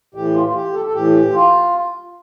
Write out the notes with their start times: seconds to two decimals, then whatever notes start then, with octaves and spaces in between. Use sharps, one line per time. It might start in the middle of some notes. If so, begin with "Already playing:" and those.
0.15 A2 E3 G4
0.34 F4
0.45 F4
0.54 G4
0.73 A4
0.85 A4
0.93 A2 E3 G4
1.33 F4